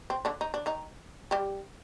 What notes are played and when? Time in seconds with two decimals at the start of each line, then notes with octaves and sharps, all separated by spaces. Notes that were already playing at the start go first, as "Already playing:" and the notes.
0.10 C4
0.25 D3 D4
0.41 D#4
0.54 D4
0.66 D#3 D#4
1.31 G3 G4